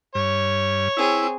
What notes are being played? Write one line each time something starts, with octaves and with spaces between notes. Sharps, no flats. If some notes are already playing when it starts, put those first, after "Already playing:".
G2 C#5
C4 E4 G#4